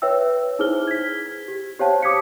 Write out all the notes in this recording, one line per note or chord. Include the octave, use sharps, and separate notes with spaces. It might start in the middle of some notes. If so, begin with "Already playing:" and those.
B4 C#5 E5 G5 E6
D#4 E4 G#4 C5 F6 G7
G#6 B6
G4
G4 C5 C#5 F5 G5 A5
D6 D#6 G#6 B6 C#7